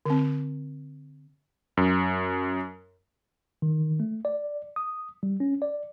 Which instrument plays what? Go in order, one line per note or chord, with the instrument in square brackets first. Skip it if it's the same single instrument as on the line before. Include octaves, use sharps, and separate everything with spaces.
[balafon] D3 C4
[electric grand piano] F#2
[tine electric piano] D#3
A3
D5
D#6
G3
C#4
D5